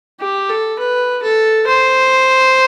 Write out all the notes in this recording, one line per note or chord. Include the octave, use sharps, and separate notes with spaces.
G4
A4
B4
A4
C5